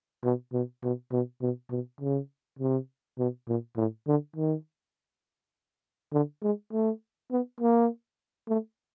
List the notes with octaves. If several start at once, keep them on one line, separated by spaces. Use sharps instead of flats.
B2
B2
B2
B2
B2
B2
C#3
C3
B2
A#2
A2
D3
D#3
D3
G#3
A3
B3
A#3
A3